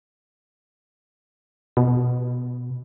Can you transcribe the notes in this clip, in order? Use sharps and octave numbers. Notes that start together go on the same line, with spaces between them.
B2